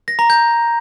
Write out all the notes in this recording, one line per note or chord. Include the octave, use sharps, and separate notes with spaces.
A#6
A#5
G6